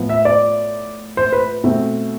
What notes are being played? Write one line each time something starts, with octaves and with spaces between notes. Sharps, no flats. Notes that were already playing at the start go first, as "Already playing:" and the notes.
Already playing: A2 F3 B3
E5
D5
C5
B4
B2 A3 C4